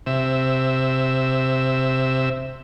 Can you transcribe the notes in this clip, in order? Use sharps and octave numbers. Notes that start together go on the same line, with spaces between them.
C3 E5